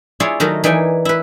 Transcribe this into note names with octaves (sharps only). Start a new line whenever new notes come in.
E4 F4 G#4 C#5 D5
D#3 F#3 A3 A#4 D#5
E3 D#4 D5 G5 G#5
E4 B4